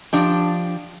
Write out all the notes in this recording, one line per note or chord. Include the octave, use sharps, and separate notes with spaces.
F3 D4 G4